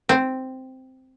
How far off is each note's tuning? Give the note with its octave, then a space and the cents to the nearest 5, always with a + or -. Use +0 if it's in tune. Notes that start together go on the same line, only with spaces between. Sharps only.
C4 -5